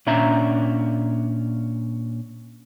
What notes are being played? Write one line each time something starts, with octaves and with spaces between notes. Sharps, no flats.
A#2 C#4 D4 E5 A#5